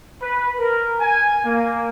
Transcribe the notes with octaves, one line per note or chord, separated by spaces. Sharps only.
B4
A#4
G#5
A#3